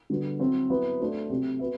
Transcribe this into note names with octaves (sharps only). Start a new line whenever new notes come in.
D3 G3 B3 F#4
F#3 C4 E4
F#3 B3 E4 B4
A3 D4 F#4 C5
C3 F#3 A3 C4 G4
B3 F#4 B4 E5